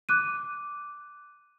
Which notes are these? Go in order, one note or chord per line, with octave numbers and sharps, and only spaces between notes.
D6 F#6 D#7